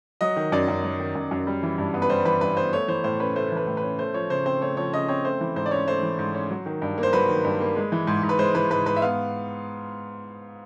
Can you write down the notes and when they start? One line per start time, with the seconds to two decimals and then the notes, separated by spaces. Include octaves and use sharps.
0.21 F#3 D#5
0.37 D#3
0.52 F#2 D5
0.68 F#2
0.84 F#3
1.00 D#3
1.15 F#2
1.31 F#2
1.47 G3
1.63 E3
1.78 G2
1.94 B3
2.02 B4
2.10 G3 C5
2.25 E3 B4
2.41 G2 B4
2.57 B3 C5
2.73 A3 C#5
2.88 E3 C5
3.04 A2 C5
3.20 C#4 B4
3.35 A3 C5
3.52 E3 B4
3.67 A2
3.77 B4
3.83 C#4
3.99 A3 C5
4.14 F3 C#5
4.30 C#3 C5
4.46 C4 C5
4.61 A3 C#5
4.77 F3 C#5
4.93 C#3 D#5
5.08 C4 C#5
5.24 A3 C5
5.41 E3
5.56 G#2 C5
5.66 D5
5.71 C#4 C#5
5.87 A3 C5
6.03 E3
6.19 G#2
6.34 C#4
6.50 F#3
6.66 D#3
6.82 G2
6.98 A#3
7.03 C5
7.13 F#3 B4
7.29 D#3
7.45 G2
7.60 A#3
7.76 G#3
7.92 E3
8.07 G#2
8.23 G#2
8.29 B4
8.39 G#3 C5
8.55 E3 B4
8.71 G#2 B4
8.86 G#2 B4
8.96 E5
9.02 B3 F5